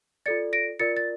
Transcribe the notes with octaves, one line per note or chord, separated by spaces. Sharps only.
F4 A4 D5 A6 C#7
A#6 D7
F4 A#4 D5 A6 C#7
A6